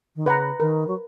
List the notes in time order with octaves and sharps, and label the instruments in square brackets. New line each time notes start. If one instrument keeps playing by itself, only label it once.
[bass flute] D#3
[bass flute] C#3 [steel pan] B4 F#5 A#5
[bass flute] D#3 [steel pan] A#4
[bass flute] F#3